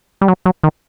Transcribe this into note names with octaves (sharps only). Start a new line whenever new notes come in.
G3
F#3
F#3
D#3